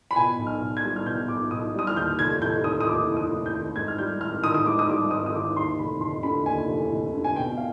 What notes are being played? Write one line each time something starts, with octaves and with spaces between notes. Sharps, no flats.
B5
B2 G#5
B1
F6
B1
G#6
G3
F6
B2 G6
B1 D6
B1 D#6
G3 D#6
F6
D#2 G6
F1 G#6
F1 G6
D#3 D#6
D#6
D#2 D6
F1
D#6
F1
G6
D#3
G#2 G#6
F6
G3 G6
G#1 F6
D#3 D#6
D#6
G#2 D6
D#6
G3 D6
G#1 D#6
D#6
D#3 D6
D#2 C6
F1 B5
F1 C6
D3 B5
D#2 G#5
F1
F1
D3
G#5
B2 G5
F5